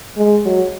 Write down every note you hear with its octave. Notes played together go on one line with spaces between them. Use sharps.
G#3
F#3